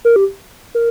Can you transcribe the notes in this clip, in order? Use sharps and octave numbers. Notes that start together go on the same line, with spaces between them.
A#4
G4
A#4